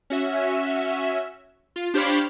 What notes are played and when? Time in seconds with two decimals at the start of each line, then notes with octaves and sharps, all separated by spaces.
0.10 C#4 F#4 E5
1.76 F4
1.94 D4 G4 C5 C#5 F5 B5